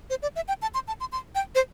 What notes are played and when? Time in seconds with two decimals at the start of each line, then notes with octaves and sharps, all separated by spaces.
0.10 C5
0.22 D5
0.36 E5
0.48 G5
0.62 A5
0.74 C6
0.88 A5
1.00 C6
1.12 C6
1.35 G5
1.55 C5